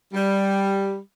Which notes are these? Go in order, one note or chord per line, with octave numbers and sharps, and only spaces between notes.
G3